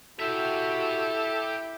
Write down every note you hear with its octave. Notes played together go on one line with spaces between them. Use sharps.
E4 F#4 G4 A4 E5